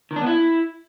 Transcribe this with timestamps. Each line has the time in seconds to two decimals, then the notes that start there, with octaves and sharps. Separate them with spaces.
0.11 D#3
0.16 D4
0.21 B3
0.26 E4